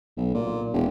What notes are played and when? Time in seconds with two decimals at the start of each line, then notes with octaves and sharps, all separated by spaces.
0.17 B1
0.34 A#2
0.74 E1